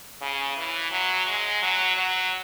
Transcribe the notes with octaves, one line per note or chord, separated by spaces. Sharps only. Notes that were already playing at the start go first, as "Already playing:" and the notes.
C#3
E3
F#3
G#3
F#3
F#3